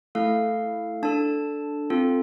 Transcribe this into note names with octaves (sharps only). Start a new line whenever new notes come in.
A3 E4 A4 F5
D4 A4 A5
C4 F4 A4